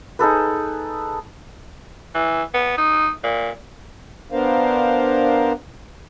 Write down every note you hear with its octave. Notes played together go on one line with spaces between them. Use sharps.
D#4 G#4 A4 B4
E3
B3
D#4
A#2
B3 D4 A#4 C5 F5